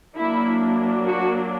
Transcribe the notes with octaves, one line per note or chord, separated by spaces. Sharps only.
F#3 A#3 D4 E4
F#4